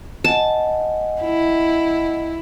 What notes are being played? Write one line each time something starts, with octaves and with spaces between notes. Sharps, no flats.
D#5 F#5 G#5 A5
E4